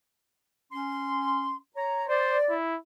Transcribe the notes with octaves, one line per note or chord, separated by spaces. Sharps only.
C#4 C6
C#5 A#5
C5 D5
E4